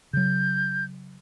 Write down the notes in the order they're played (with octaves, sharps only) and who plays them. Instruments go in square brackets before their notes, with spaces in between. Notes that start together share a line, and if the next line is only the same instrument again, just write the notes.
[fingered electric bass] C#3 F#3 [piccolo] G6